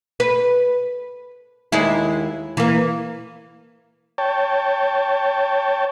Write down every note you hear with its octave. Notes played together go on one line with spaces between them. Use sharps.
B4
D#2 G#3 E4
E3 A#3
C#5 G5 A5